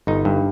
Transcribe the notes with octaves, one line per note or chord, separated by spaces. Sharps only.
G1 D#4
G2